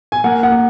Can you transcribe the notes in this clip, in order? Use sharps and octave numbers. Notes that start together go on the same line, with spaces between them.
G#5
A#3 F#5
F#5
A#3